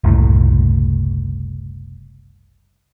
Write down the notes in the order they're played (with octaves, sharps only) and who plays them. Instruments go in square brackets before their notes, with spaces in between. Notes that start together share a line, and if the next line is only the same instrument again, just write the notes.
[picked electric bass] F#1 C2 A2